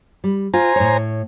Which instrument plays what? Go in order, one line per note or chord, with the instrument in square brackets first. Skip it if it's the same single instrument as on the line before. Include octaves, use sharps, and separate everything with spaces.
[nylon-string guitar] G3
[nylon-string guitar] F4 [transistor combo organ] C5 G#5 A#5
[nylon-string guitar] A2 C#5